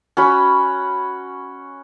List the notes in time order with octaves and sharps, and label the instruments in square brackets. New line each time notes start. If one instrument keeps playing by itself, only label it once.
[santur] C#4 F#4 B5